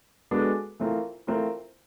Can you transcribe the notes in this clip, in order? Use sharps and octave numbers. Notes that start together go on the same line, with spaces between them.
G#3 B3 D4 F#4 A4
E3 A3 C4 F4 A#4
E3 A3 C4 F4 A#4